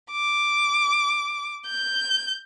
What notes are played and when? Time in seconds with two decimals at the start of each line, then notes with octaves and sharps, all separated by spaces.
0.11 D6
1.66 G6